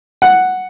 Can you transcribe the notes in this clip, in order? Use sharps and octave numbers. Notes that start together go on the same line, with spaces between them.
F#5